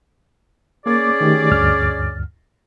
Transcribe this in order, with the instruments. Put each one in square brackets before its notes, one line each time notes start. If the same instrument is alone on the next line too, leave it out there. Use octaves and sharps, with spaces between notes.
[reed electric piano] A#3 D6 [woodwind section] C#4 G#4 D5
[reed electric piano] D#3 A3 G4
D2 G2 F6